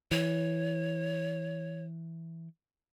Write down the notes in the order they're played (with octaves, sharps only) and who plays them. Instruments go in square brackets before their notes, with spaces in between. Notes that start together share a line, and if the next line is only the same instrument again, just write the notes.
[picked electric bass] E3 [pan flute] C#5